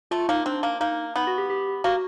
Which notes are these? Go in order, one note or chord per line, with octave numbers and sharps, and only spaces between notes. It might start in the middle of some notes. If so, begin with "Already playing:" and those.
A3 F4
A#3 D#4
C4 D4
A#3
A#3 D#4
B3 D#4
F#4
G4
G4
A#3 F#4